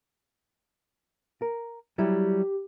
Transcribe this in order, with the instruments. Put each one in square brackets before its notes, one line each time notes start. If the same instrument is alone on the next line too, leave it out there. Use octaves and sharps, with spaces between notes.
[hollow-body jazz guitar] A#4
[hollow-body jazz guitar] F#3 G3 E4 [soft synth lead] G4